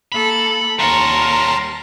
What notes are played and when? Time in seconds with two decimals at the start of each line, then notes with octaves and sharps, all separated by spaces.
0.12 A#3 A4 B5
0.79 D#2 G3 A#4 C#5 A5 A#5 C6